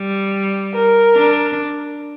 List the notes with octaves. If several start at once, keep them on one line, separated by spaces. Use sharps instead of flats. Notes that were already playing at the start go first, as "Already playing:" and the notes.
Already playing: G3
A#4
D4